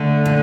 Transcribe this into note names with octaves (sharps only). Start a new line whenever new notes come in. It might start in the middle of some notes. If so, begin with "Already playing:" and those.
Already playing: D3 A3
A#2